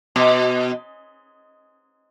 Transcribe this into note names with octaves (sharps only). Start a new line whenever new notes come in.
B2